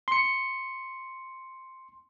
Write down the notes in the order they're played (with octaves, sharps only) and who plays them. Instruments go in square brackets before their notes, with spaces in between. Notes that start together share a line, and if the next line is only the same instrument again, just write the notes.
[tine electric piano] C6 C#7